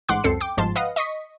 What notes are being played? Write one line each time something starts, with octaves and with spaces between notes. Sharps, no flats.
A1 G#2 F#5 C6 D6 F#6
C#2 F#2 C4 A4 C7 C#7
G5 D6
G1 G#2 F3 A5 C6
B4 D#5 F5 F#5 D#6
D#5 C#6 D#6 B6